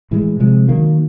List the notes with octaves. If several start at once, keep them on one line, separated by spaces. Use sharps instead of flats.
A2 E3 G#3
C3 F3 G#3
D#3 F#3 A#3